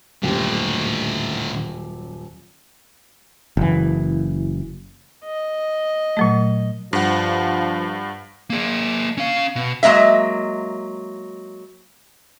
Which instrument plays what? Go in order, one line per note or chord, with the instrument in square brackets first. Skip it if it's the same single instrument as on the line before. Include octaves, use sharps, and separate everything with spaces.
[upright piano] D#1 F#2 G4 [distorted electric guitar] A2 D3
[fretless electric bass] F#1 E3
[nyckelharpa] D#5
[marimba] A#2 F#3 A3
[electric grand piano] G2 F#5 [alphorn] F3
[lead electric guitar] A#3 G#4
C#4 F5
B2
[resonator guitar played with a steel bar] F#3 G#3 A#3 D#5 E5